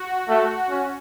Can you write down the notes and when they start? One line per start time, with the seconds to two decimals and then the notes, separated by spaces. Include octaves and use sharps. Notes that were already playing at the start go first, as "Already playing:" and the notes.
Already playing: F#4
0.29 A3
0.70 C#4